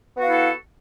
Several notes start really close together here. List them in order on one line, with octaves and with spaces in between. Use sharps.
B3 F#4 F5 E4 A4